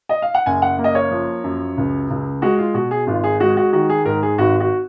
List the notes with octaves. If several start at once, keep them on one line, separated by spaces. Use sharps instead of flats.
D#5
F5
F#5
F#1 G#5
F#5
A#3
D#5
C#5
F3
F#2
C#2
C#2
G#3 F#4
F4
B2 F#4
G#4
G#1 F4
G#4
G#3 F#4
F#4
D#3 F#4
G#4
G#2 A#4
G#4
G#1 F#4
F#4